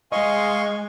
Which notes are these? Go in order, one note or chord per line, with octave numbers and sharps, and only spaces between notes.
G#3 D#5 F5 G#5 C6 C#6